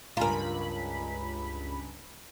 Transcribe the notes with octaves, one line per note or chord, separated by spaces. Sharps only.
C#2 G2 F4 A#4 G#5 A#5 B5